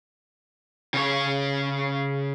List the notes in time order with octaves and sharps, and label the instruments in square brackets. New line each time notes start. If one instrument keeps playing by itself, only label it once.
[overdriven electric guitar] C#3 C#5